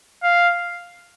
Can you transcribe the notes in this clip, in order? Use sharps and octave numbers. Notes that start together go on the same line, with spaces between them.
F5